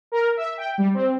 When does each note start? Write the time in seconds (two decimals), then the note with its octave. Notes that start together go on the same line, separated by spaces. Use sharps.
0.12 A#4
0.37 E5
0.58 G5
0.78 G3
0.94 C4